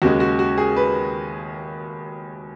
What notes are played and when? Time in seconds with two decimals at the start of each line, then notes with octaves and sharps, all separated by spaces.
0.02 D#2 C#3 G#3 F#4
0.20 F#4
0.39 F#4
0.58 G#4
0.76 B4